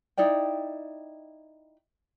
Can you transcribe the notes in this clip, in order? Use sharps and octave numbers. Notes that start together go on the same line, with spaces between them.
D#4 E4 D5 G5